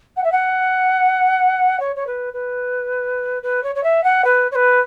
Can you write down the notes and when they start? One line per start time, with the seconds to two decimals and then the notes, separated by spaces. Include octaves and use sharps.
0.17 F#5
0.24 E5
0.32 F#5
1.80 C#5
1.96 C#5
2.07 B4
2.34 B4
3.43 B4
3.63 C#5
3.75 C#5
3.84 E5
4.04 F#5
4.25 B4
4.52 C#5
4.55 B4